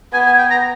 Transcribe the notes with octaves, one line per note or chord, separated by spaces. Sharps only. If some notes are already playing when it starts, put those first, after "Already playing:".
B3 G#5
G#5
G5
A#5